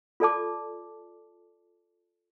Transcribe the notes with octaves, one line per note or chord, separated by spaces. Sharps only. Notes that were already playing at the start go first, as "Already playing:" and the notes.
F4 A4 D5 A5 D6